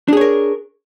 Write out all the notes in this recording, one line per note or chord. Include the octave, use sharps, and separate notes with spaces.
D4 G#4 A#4 C#5